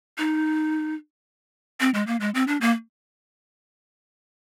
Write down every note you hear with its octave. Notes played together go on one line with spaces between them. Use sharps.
D#4
C4
G#3
A#3
G#3
C4
D4
A#3